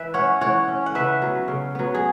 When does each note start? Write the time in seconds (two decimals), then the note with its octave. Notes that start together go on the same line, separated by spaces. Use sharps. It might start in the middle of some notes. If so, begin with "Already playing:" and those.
Already playing: E3 B4 E5
0.14 C#4 C#5 F#5
0.41 E3 C#5 F#5
0.68 C#4
0.86 F#5
0.95 C#3 B4 E5
1.22 F#3 B3
1.48 C#3
1.75 F#3 B3
1.94 G#4